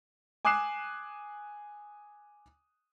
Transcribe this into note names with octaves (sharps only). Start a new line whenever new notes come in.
G#5 D6 D#6 F#6 C7 E7